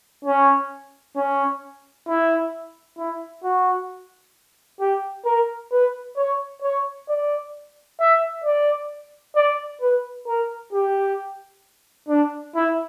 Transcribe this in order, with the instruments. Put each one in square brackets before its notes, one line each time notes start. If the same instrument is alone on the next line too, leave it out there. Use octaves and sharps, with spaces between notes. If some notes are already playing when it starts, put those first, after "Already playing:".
[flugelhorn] C#4
C#4
E4
E4
F#4
G4
A#4
B4
C#5
C#5
D5
E5
D5
D5
B4
A#4
G4
D4
E4